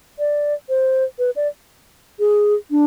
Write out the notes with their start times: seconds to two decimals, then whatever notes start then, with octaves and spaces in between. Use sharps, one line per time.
0.19 D5
0.69 C5
1.19 B4
1.36 D5
2.19 G#4
2.71 D4